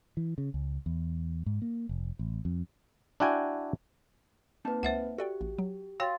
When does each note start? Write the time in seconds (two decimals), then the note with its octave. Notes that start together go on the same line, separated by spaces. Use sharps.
0.17 E3
0.38 C#3
0.54 C#2
0.86 E2
1.46 G#2
1.62 A#3
1.89 F1
2.19 A1
2.45 F2
3.20 D4 E4 F#4 G5 G#5
4.65 A#3 C4 D#4 B4 A5
4.83 C#2 C5 E5 F#5
5.18 F#4 G4 A4 D5 G5
5.41 A1
5.58 F#3
6.00 F#4 C#5 F5 G5 C6 A6